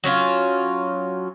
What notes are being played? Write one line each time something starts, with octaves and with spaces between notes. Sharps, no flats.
F#3 C#4 F4